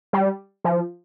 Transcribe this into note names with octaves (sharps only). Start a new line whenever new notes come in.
G3
F3